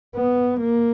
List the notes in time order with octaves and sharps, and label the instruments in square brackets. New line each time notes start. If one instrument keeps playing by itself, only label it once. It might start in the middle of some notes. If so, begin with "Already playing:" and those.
[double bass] B3
A#3